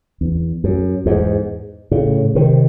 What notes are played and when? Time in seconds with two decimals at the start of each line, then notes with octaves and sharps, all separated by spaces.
0.21 E2
0.64 F#2
1.06 E2 G#2
1.91 A2 C#3
2.35 C3 D#3